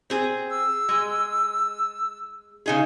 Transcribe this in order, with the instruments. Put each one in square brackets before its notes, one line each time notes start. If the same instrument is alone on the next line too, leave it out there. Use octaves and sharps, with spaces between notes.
[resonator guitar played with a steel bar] C4 G#4
[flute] E6
[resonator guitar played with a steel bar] G#3
C#3 D#4 G#4